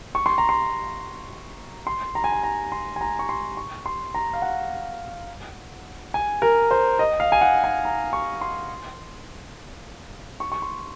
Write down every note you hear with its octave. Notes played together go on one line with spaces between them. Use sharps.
C#6
C6
A#5
C6
C6
A#5
G#5
A#5
A#5
C6
G#5
A#5
C#6
C6
C#6
C6
A#5
F5
F#5
G#5
A#4
C5
D#5
F5
G#5
F#5
G#5
A#5
C#6
C6
C#6
C#6
C6